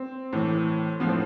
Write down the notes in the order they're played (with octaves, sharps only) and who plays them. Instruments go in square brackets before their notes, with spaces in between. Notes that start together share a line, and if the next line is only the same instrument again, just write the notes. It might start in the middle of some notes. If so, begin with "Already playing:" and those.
Already playing: [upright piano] C4
A2 E3
A2 F3 B3
C4